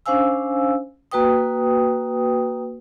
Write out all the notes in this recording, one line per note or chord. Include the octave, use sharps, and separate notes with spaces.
C#4 D4 C5 F5 G#5 E6
A#3 F#4 B4 G5 D#6